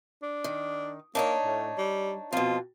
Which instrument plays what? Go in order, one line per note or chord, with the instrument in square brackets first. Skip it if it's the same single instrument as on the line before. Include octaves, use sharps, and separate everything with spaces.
[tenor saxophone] D4
[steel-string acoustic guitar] D#3
[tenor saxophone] A#3 [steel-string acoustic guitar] D4 D#4 C#5
[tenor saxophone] A2
G3
[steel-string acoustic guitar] F2 B2 [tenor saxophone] F4